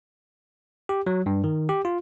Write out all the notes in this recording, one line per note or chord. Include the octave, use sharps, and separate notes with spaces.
G4
F#3
G2
D#3
G4
F4